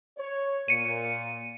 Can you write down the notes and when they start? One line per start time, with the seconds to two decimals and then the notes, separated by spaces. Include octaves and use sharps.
0.18 C#5
0.68 A#2 C#7 D#7